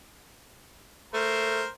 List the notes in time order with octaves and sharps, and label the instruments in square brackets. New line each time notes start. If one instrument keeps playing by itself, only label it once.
[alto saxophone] A3 [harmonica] A#4 C5